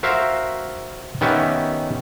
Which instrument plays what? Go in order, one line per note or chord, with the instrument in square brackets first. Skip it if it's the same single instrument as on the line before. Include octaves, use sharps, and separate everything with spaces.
[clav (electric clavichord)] F#4 A#4 C5 E5 F5
D#3 B3 C#4 G4 E5